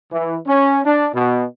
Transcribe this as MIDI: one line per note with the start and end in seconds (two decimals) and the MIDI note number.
0.12 0.37 52
0.47 0.80 61
0.85 1.08 62
1.15 1.44 47